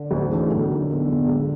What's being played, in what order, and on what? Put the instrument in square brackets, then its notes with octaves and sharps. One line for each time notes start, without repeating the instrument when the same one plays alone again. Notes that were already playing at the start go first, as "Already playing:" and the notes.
Already playing: [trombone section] D3
[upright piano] D2
C#3 E3 A3 C#4
[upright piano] B1 [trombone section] D3
[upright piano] A#2 F#3 A#3 D#4
E2
B2 F#3
C#2